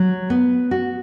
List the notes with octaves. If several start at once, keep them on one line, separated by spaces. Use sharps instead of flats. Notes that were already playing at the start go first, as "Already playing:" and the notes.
Already playing: F#3
B3
F#4